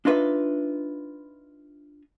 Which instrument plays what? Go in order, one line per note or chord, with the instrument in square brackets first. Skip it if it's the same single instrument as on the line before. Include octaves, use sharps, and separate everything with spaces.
[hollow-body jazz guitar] D4 D#4 F4 B4 E5